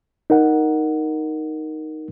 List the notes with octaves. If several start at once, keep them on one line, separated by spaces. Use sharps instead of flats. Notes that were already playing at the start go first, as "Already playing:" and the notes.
D#4 A#4 F#5